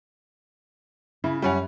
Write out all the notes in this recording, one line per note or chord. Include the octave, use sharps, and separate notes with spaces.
C#3 E4
F#2 G3 C#4 F#5